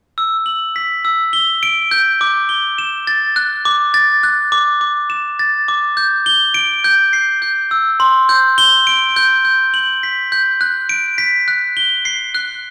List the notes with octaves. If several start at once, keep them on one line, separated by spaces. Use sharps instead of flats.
E6
F#7
B6
E6
G7
D7
G6
D6
G7
E7
A6
F#6
D6
A6
F#6
D6
D6
E7
A6
D6
G6
G7
D7
G6
C7
G6
E6
C6
G6
G7
D7
G6
G6
F#7
B6
G6
F#6
D7
B6
F#6
G7
C7
F#6